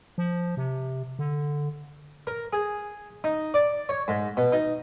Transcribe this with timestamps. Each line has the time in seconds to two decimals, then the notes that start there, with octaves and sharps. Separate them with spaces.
0.18 F3
0.57 C3
1.19 D3
2.27 A#4
2.53 G#4
3.24 D#4
3.54 D5
3.89 C#5
4.08 G#2
4.37 B2
4.52 D#4